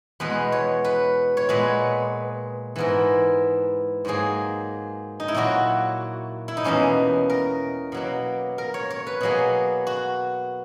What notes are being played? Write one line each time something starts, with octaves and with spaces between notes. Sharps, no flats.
E2 B2 G#3 B3 B4
C#5
B4
C#5
A#2 G#3 B3 B4
G#2 E3 B3 A#4
G#2 F#3 A#3 G#4
D#4
E4
A#2 F#3 A#3 F#4
E4
D#4
E2 B2 A#3 C#4
A#4
B2 F#3 A#3
A#4
C#5
C#5
B4
B2 F#3 A#3 G#4
F#4